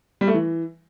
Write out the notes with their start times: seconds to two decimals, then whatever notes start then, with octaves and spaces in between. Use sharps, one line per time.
0.21 G3
0.28 A3
0.34 E3